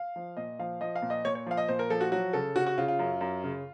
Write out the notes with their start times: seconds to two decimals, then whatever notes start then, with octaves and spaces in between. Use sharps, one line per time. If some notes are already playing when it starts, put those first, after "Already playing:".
Already playing: F5
0.16 F3
0.37 A#2 D#5
0.59 F3 F5
0.81 F3 D#5
0.96 F5
1.02 A#2
1.10 D#5
1.25 A#2 C#5
1.35 C#5
1.46 F3 F5
1.57 D#5
1.68 A#2 C5
1.79 A#4
1.90 F3 A4
2.01 F#4
2.12 F#3 F#4
2.33 C#3 A4
2.56 C#3 F#4
2.66 F#4
2.78 C#3 F4
2.88 F4
2.99 F#2
3.21 F#2
3.44 C#3